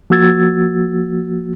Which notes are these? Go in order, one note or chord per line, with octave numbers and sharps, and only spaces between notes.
F3 A#3 F#4 E6 G#6 A6